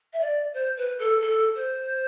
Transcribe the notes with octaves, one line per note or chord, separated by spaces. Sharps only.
E5
D5
C5
B4
A4
A4
C5